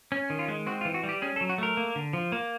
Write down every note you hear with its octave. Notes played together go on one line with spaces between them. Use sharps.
C#4
D#3
F4
G#3
C4 F#4
F4
E3
F#4
G3
G4
C#4 G#4
A4
F#3
F#4
A3 A#4
A#3
D3
F3
A#3